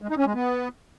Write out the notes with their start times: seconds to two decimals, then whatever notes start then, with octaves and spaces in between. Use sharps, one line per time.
0.02 G#3
0.10 D#4
0.18 C#4
0.26 G#3
0.34 B3